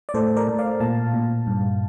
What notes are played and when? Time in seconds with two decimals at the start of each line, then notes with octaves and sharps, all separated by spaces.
0.09 D5
0.14 A2 A4 C5
0.37 A#4 D5
0.47 A2
0.59 D5 F5
0.80 A#2 F5 A5
1.14 A#2
1.47 G2